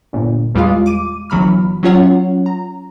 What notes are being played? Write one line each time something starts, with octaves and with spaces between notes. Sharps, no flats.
G1 A#2
E2 G3 G#3 F4 F5
D6 D#7
G1 E3 F#3 B5 F6
F#3 C#4 F4 C#5 F#5
A#5